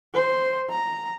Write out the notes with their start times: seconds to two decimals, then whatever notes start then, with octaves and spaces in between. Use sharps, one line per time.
0.14 C5
0.70 A#5